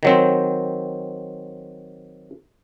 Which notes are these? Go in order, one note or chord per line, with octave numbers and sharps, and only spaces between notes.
D#3 F#3 C4